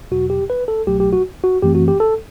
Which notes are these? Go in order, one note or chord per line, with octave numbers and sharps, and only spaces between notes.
E2 B2 F#3 F#4
G4
B4
A4
C2 B2 F#3 A3 G4
G4
F#4
F#4
F#2 E3 A3 C4 G4
F#4
G4
A4